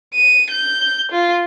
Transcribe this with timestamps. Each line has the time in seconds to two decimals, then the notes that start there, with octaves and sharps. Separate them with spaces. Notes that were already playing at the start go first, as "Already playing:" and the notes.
0.15 D#7
0.50 G6
1.11 F4